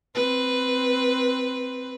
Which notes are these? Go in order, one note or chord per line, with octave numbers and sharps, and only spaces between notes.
C4 B4